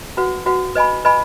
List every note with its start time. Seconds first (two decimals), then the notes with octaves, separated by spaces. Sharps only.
0.17 F#4 B4 F#5
0.46 F#4 B4 F#5
0.75 B4 D#5 G#5 B5
1.05 B4 D#5 G#5 B5